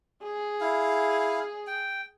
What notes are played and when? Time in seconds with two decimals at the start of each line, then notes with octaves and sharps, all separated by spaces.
0.23 G#4
0.61 E4 F5
1.67 G5